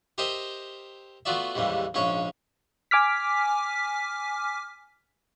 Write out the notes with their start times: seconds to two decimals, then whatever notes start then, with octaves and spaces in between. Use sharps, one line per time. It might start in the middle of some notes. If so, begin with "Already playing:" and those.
0.18 G4 A#4 C5 D#5 E5 G5
1.25 A3 B3 F4 F#4 D5 E5
1.55 D#2 G#2 C#3 E3 G3
1.94 A#1 G#2 C#3 C#4 C#5
2.91 G#5 D6 F6 B6